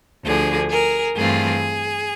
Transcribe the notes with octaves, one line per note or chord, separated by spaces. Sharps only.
D2 D3 F3 G#4
G#4 A#4
G2 E3 A3 C4 F4 G#4